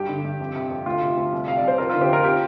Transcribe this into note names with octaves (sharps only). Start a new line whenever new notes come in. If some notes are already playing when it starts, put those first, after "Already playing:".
Already playing: G2 G4
D3
G2
F2
C3
F2
D2 F4
C3
D2
C2
C3 F5
D5
C2
C5
F2 F4 A#4
D3 F4 A#4
G4 C5
F2 F4 A#4
G4